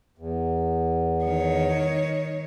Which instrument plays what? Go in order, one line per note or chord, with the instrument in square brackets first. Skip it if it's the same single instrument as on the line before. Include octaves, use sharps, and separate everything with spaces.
[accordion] E2
[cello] D#3 C#5